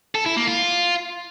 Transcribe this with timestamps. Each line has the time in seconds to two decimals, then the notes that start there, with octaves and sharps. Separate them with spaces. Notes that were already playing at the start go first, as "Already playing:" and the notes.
0.15 A4
0.26 E4
0.37 A#3
0.48 F4